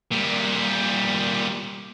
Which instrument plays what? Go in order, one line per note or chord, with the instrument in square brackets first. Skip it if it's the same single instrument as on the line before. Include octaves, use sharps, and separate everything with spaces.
[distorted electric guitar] A#2 G3